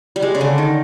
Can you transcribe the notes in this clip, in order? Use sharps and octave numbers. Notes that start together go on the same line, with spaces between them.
G3
G#3
C#3
D3
D#3